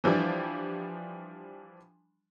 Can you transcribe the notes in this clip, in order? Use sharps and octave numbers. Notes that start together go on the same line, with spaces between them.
E3 F3 G3 D4